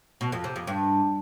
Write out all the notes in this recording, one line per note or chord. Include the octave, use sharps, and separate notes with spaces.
B2
F2
C3
F2
G2